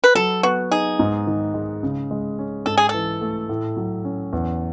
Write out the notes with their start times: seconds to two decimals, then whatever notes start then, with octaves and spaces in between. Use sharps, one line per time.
0.04 B4
0.15 F#3 A4
0.43 B3 F#4
0.71 D#4 G#4
0.99 G#2
1.27 D#3
1.54 G#3
1.83 C#3
2.11 G#3
2.39 C#4
2.66 G#2 A4
2.77 G#4
2.89 E3 A4
3.21 A3
3.49 A2
3.77 F#3
4.05 C#4
4.33 E2